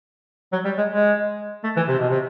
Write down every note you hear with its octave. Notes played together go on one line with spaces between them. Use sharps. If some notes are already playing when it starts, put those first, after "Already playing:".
F#3
G3
G#3
G#3
A3
E3
C3
B2
C3